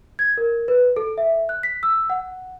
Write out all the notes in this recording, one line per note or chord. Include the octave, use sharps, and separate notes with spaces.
G#6
A#4
B4
A4
E5
F#6
B6
E6
F#5